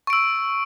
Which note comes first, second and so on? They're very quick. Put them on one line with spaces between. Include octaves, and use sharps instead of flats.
C#6 D7 E6